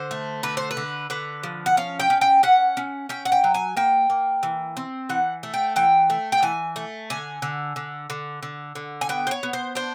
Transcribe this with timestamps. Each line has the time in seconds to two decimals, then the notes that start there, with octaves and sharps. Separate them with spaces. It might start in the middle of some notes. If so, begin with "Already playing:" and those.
Already playing: D3 C5
0.11 A3
0.43 D3 B4
0.57 C5
0.71 B4
0.77 D3
1.10 D3 B4
1.43 F3
1.66 F#5
1.77 C#4 F5
2.00 G5
2.10 C#4
2.21 G5
2.43 C#4 F#5
2.77 C#4
3.09 C#4 G5
3.25 F#5
3.32 G5
3.44 F#3
3.54 G#5
3.77 A#3 G5
4.10 A#3
4.43 E3
4.77 C4
5.09 E3 F#5
5.43 A3
5.54 G5
5.76 E3 G5
6.10 A3
6.32 G5
6.43 E3 G#5
6.76 A3
7.10 D3 G#5
7.42 D3
7.76 D3
8.10 D3
8.43 D3
8.75 D3
9.01 G#5
9.09 B3 G5
9.27 C5
9.31 C#5
9.43 B3
9.53 C5
9.75 D4 C5